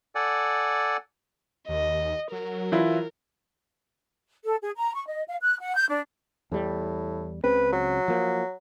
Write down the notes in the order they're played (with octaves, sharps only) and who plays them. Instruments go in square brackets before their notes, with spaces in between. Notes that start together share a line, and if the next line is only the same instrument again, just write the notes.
[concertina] A4 D5 F#5 G#5
[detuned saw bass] D#2 [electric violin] D#5
[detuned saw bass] F#3 [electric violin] A#4
[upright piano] E3 E4 F4
[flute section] A4
G#4
A#5
C#6
D#5
F5
F#6
F#5
G6
D4
[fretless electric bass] E2 G3 [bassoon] A2
[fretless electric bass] C#2 C#3 C4 [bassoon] B4
[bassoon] F#3
[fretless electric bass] F3 A#3